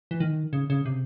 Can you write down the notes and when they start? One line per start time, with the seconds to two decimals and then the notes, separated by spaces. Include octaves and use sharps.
0.11 E3
0.20 D#3
0.53 C#3
0.70 C#3
0.86 C3